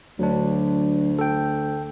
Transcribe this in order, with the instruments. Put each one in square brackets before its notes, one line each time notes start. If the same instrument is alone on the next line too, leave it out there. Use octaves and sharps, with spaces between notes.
[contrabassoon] D2 [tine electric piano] F#3 D4
[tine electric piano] A4 G5